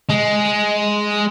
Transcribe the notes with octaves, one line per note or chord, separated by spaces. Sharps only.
G#3